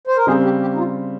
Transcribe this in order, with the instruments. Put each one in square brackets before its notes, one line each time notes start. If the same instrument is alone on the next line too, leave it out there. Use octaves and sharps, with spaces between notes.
[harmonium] C5
A#4
[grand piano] C#3 G3 C4 [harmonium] G#4
[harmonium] G4
G4
D#4
F4